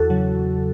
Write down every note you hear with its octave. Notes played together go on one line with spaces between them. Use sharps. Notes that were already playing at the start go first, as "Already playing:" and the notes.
Already playing: E2 F#4 A4
C#3 F#3